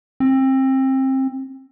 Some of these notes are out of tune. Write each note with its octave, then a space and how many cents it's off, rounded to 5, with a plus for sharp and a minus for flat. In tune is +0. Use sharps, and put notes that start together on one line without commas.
C4 +25